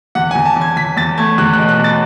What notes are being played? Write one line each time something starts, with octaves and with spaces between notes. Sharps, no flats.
E2 F#5
G#5
E2
A5
E2
G#6
E2 B6
E2 A6
A3 G#6
E2 F#6
F#6
B2
F#6
B2
A6